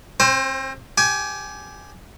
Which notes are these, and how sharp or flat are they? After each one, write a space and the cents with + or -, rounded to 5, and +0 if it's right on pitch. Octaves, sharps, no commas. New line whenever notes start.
C4 +35 C5 +0
G4 +0 G#5 +20